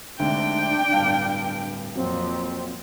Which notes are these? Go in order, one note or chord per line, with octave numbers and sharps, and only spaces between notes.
D2 G#2 C3 D4 G5
D1 G2 F5
F2 A#2 F#3 C4